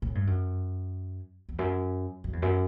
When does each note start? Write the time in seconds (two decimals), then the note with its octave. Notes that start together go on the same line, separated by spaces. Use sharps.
0.02 A2
0.15 G2
0.27 F#2
1.49 E2
1.59 F#2
2.24 F#2
2.33 E2
2.42 F#2